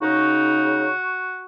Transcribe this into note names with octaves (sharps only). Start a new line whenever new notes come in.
C#3 D#4 F#4